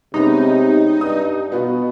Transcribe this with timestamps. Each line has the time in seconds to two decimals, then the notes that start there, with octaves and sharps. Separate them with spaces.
0.14 C3 G#3 B3 C#4 D#4
1.01 G2 D#6
1.52 B2 B3 F4 F#4